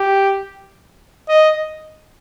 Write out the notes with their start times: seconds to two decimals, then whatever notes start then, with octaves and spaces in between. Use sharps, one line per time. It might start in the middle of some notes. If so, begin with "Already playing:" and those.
Already playing: G4
1.29 D#5